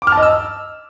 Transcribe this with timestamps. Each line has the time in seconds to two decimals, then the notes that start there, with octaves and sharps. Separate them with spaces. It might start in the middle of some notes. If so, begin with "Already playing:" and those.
0.02 D6
0.07 F6
0.12 A5
0.17 D#5
0.23 E6